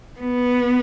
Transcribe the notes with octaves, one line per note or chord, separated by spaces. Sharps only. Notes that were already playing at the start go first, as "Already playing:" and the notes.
B3